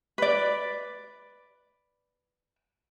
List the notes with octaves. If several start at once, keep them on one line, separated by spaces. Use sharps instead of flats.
B4 D5